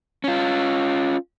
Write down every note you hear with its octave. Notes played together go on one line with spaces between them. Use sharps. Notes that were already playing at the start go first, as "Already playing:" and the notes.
C#4 F4